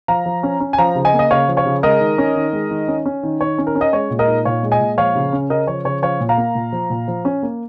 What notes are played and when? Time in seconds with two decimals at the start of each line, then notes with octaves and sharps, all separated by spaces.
0.08 F3 F5 A#5
0.26 F3
0.43 C#4
0.60 C#4
0.73 G#5
0.78 F3 F5 A#5
0.95 C#3
1.05 D#5 G#5
1.13 A#3
1.19 D#5
1.31 C#3 C#5 F5
1.48 F3
1.57 C#5 F5
1.66 C#3
1.83 G#3 A#4 D#5
2.00 D#3
2.18 C#4
2.36 D#3
2.53 G#3
2.71 D#3
2.88 C#4
3.06 C#4
3.23 D#3
3.41 D#3 C#5
3.58 C#4
3.67 A#4
3.75 C#4
3.81 D#5
3.93 G#3 C#5
4.10 A#2
4.19 A#4 D#5
4.28 D#4
4.45 A#2 C#5 F5
4.63 G#3
4.72 D#5 G#5
4.80 A#2
4.98 F3 C#5 F5
5.15 C#3
5.33 C#4
5.50 C#3 A#4 D#5
5.67 F3 C#5
5.85 C#3 C#5
6.03 F3 C#5 F5
6.20 A#2
6.29 F5 A#5
6.37 A#3
6.55 A#2
6.72 F3
6.90 A#2
7.08 F3
7.25 C#4
7.43 A#3